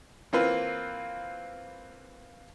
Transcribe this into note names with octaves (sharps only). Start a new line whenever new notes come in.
E3 A#3 C4 F4 B4